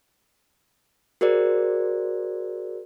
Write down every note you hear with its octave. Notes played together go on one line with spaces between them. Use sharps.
F#4 G#4 A#4 C5 D5